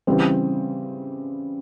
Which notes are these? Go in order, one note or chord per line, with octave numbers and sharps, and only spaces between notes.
C#3 E3 G3 C4